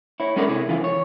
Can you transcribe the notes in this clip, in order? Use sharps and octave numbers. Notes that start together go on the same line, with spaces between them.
E4 C#5
G#3 C#4 A4 A#4 D5
C3 E4 G#4
C#3 E3 F4
C#5